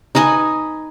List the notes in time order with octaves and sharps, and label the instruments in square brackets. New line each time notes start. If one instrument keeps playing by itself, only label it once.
[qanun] D#4 B4 D#5 G#5